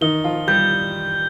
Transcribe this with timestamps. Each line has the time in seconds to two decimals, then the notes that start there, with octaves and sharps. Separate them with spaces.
0.01 D#3 D#4 G7
0.24 F3 F4
0.47 G3 G4 G6